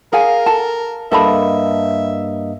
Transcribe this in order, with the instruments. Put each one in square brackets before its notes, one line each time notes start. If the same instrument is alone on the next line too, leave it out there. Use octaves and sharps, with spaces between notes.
[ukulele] G#4 F5 G#5 [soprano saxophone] A#4
[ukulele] A4 A5
[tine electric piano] G2 A#3 D#5 [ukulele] A4 A5 B5 [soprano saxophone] E5